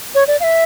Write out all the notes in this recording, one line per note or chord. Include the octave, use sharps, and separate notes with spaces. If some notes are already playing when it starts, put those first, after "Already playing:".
C#5
D5
F5
E5